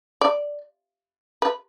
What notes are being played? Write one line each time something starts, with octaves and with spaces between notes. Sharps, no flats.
D5
B4